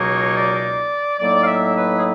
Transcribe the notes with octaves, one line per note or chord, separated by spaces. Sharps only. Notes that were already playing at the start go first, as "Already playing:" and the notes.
Already playing: C#2 B2 F#3 A#3 D#4 C#5
D5
A2 F#3 A#3 D#4 D5
F5
E5
B4
G#4